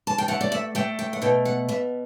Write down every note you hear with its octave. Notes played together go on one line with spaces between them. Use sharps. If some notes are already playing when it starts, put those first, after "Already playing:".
A5
G5
A3 F#5
D5
E5
A3 G5
G5
F#5
B2 G5
F#5
B2 E5